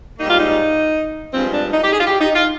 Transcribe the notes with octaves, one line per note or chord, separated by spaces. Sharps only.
G#2 G3 A#3 D#4
F4
D#4
G2 F3 G#3 C4
D4
D#4
G4
G#4
F4
G4
D#4
F4